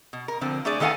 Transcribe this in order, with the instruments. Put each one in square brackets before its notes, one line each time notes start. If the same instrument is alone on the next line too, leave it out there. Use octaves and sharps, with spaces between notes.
[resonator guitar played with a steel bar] B2
A#4
D3 F3 C4
A3 D4 G#4 D5
D#3 B3 A4 F5 F#5 G#5